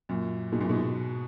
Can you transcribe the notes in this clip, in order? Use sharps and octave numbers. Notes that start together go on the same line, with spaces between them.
F#2 A#2
G#2 B2
F#2 A#2
G#2 B2